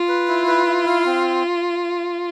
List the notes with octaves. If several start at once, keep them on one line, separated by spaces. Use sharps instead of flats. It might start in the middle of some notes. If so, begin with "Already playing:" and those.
Already playing: F4
B4
E4
B4
E4
F5
C4